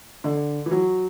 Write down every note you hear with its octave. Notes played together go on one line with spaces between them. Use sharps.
D3
E3
F#3